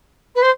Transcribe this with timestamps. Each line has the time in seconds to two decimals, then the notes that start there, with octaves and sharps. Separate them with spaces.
0.35 B4
0.42 C5